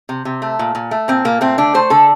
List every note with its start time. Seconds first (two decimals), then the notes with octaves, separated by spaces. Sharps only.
0.09 C3
0.25 C3
0.42 A3
0.59 A#2
0.75 A#2
0.91 A3
1.08 A#2 C4
1.25 A#2 A#3
1.41 A3 C4
1.58 D3 D4
1.74 A3 C5
1.90 D3 A4